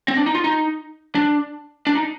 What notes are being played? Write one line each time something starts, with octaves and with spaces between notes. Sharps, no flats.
C4
D4
D#4
F4
D#4
D4
D4
D#4